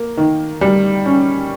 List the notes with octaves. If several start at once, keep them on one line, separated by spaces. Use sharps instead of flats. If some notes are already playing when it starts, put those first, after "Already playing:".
Already playing: A#3
D#3
G3
C#4